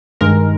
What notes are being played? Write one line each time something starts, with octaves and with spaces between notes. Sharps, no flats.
G2 D#3 G#3 A#4